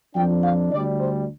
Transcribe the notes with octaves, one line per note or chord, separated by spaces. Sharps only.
F2 F3 D4 G5
F5
D2 D3 G3 D4 D5
C5